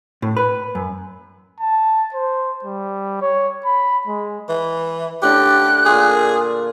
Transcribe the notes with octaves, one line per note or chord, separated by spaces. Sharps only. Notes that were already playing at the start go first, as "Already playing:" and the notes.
A2
B4
F#2
A5
C5
G3
C#5
B5
G#3
E3
A2 D3 D4 G4 F#6
A#2 F4 G#4 D6